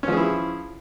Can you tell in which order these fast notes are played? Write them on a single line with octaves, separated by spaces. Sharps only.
C#4 F3 G#4 E4